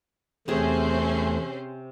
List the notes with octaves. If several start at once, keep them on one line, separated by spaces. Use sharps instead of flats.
E2 C3 A3 C4 C#4 G#4 C5